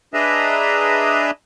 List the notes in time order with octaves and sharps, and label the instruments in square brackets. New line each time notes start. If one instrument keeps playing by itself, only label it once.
[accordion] D4 G#4 B4 D#5 E5 A#5